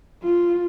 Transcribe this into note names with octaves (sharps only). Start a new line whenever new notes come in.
F4